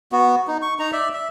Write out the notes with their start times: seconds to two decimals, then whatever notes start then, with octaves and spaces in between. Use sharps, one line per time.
0.12 B3 F#4
0.47 D#4
0.62 C#6
0.79 D#4 A#5
0.92 D5 E5
1.14 E5